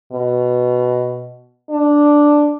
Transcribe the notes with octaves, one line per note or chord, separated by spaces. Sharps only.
B2
D4